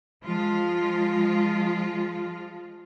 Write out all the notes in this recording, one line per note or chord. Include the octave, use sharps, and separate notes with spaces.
F3 G#3 F4